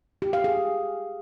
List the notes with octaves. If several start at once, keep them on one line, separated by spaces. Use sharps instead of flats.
G4
F5
G#4